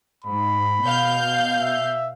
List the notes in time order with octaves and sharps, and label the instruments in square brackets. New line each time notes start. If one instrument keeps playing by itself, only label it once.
[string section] G#2 [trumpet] B5
[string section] B2 F5 G6
[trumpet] E5